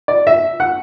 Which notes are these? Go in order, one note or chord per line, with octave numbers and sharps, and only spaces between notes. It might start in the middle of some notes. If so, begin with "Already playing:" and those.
D5
E5
F#5